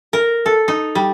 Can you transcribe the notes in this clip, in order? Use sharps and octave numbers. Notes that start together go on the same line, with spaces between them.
A#4
A4
D#4
G3